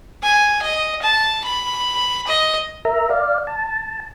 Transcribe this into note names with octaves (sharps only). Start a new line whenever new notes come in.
G#5
D#5
A5
B5
D#5
A#4 E5 A#5
D5 F5
A5